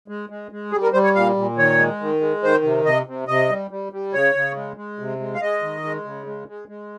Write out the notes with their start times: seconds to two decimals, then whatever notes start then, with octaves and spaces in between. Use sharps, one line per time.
0.08 G#3
0.30 G#3
0.52 G#3
0.72 G3 G#4
0.83 A#4
0.93 G3 C5
1.04 C#5
1.15 A#2 F5
1.36 A#2
1.57 D#3 C#5
1.79 G#3
2.01 D#3
2.21 G#3
2.43 D#3 C5
2.64 C3
2.85 C3 D#5
3.06 C3
3.28 C3 D#5
3.50 G3
3.71 G3
3.92 G3
4.13 C#3 C#5
4.35 C#3
4.56 G#3
4.77 G#3
4.99 C3
5.20 G#3
5.34 F5
5.41 G#3 D#5
5.62 D#3
5.84 G#3
6.05 C#3
6.27 G#3
6.48 G#3
6.68 G#3